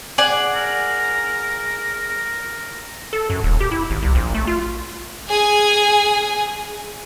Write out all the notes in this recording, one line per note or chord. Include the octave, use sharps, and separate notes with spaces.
G#4 D5 F#5
A#4
A4
F#2
D#1
G4
E4
G#1
C2
A#1
A3
F4
G#4 G#5